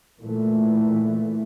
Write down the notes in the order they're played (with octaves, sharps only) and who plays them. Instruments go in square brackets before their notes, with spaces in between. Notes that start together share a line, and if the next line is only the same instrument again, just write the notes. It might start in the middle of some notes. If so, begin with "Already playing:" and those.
[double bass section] A#2 E3 A3